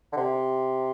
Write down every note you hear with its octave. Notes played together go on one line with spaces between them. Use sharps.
D3
C3